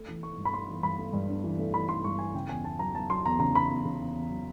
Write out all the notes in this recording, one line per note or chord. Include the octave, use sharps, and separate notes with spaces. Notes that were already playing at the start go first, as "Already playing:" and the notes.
Already playing: A3
E3
A3 C#6
G2
B5
A3 C6
E3
G2 B5
A3
G2
D4
E3
A3
E3 B5
A3 C6
G2 C#6
E3 G#5
C#3 G5
E2 G#5
E2 A5
F#3 A#5
F#3 A5
F#3 C6
E2 A#5
C#3 A#5
E2 B5
E2
C#3
E2
E2
F#3